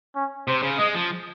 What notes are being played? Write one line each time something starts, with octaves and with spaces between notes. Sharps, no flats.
C#4
C3 C5
C#3
G#3 D#5
F3